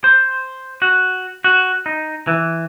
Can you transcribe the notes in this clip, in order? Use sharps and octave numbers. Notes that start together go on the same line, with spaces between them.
C5
F#4
F#4
D#4
E3